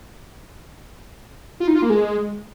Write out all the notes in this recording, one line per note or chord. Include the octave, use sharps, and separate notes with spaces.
F4
D#4
F4
A#3
G#3